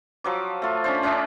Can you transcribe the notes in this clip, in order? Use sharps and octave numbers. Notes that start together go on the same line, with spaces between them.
F3 F#3 D6
A3 F4
C#4 D4 C5
C#4 D4 E5